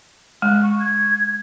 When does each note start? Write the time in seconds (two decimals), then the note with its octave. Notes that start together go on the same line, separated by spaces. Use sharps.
0.42 G#3 F#6
0.63 C#6
0.80 G#6